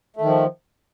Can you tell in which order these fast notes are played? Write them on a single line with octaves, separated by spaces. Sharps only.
A3 D#3 F3